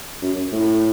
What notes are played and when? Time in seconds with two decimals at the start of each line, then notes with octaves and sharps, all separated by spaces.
0.22 F#2
0.52 A2